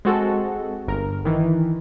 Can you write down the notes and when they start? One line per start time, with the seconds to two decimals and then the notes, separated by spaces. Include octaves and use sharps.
0.05 G#3 C4 F#4 A4
0.88 G1 A#4
1.25 D#3 E3